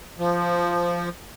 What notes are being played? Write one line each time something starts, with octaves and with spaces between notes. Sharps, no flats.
F3